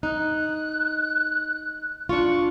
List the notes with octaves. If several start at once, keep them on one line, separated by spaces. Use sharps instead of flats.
D#4 F#6
D4 F4 C#6